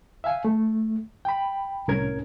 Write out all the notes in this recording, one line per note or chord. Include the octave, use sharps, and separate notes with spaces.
E5 F5 G#5
A3
G5 B5
C2 A2 C#4 A#4 G#6